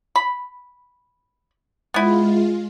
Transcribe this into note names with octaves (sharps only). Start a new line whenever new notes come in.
B5
G#3 B3 E4 F4